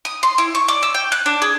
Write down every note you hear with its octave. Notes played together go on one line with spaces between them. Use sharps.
D#6
C6
E4
C#6
D5
E6
G5
F#6
D4
G#4